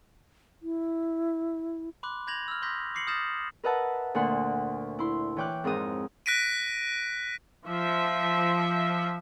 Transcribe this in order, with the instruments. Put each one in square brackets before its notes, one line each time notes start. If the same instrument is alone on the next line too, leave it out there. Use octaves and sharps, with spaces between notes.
[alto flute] E4
[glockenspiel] B5 C6 D6 F#6
B5 G6 G#6 A#6 F7 F#7
E6 F6
C6 C#6 D#6 G6 A#6 B6
D6 A#6 C7 C#7 F#7
D#6 F6 G6 A6 A#6 E7
[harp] A#4 B4 D#5 E5 F#5 A5
D2 A#2 F#5 C6
E4 C6
E3 C#5 G5 D6 F#6
F2 G#2 A#4 D#6
[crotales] F#6 A#6 B6 D7 D#7
[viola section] F3 E5